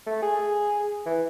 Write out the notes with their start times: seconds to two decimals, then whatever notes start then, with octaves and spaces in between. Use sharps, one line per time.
0.06 A3
0.22 G#4
1.06 E3